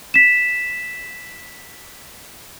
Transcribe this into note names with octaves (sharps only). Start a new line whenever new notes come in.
B6 E7